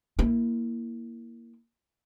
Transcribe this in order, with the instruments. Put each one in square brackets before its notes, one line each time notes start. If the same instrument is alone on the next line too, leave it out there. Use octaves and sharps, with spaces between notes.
[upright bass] A#3 E4